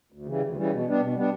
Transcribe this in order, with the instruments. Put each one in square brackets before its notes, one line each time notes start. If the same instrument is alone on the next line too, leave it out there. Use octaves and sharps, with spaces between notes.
[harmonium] D2
C#3 E3 G3
D2
C#3 E3 G3
B2
G3 B3 D4
B2
G3 B3 D4